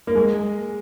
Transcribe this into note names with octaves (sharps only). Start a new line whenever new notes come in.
A#3
G#3